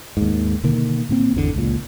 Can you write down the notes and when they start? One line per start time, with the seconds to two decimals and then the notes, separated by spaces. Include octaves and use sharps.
0.17 D#2 G#2
0.64 B2 D3 D#3 A#3
1.09 A2 A#3 C4
1.35 G#1 E2 B2 D3
1.55 C#2 A#2